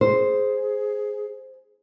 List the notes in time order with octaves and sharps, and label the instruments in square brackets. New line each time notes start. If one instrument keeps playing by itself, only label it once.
[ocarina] G#4 [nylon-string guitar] C5